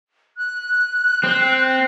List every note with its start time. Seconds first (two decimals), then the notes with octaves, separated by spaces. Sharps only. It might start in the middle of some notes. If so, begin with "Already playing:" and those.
0.37 F#6
1.24 C4